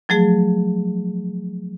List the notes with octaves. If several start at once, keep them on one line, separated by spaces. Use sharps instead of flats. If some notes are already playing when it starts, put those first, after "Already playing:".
F3 F#3 A3 G#4